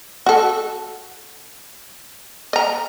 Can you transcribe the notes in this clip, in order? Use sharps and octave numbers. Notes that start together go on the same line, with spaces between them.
F#4 A4
D#5 A#5